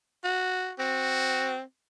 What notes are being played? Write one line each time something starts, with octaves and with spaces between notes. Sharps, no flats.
F#4
C4 F#4